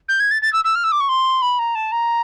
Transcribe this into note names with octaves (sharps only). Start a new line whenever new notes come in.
G6
G#6
A6
A6
E6
E6
F6
E6
D6
C#6
C6
B5
A#5
A5
A#5